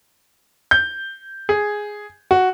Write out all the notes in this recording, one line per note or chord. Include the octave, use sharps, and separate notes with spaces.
G6
G#4
F#4